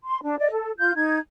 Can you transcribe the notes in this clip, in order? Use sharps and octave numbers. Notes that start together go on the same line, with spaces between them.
C6
D4
D5 D#5
A4
F4 G6
D#4 G#6